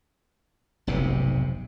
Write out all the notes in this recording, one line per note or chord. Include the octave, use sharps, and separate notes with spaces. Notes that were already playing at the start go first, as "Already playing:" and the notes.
F1 B1 G#2 C3